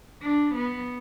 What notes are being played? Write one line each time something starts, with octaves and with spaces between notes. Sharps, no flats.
D4
B3